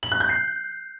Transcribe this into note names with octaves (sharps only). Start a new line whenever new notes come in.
F#7
F#6
G6
C7